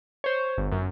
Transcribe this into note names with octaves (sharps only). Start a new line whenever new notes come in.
C5 C#5
G1
F#2